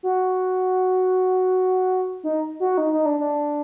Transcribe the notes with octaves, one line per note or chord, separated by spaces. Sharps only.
F#4
D#4
F#4
D#4
D#4
D4
D4